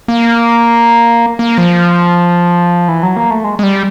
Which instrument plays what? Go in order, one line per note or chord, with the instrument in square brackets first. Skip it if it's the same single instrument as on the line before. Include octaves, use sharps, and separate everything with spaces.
[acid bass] A#3
A#3
F3
E3
F#3
A#3
A3
G#3
G#3
G3